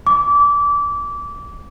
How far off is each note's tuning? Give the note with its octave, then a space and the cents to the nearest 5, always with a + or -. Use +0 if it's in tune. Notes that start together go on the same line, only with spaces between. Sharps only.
D6 -25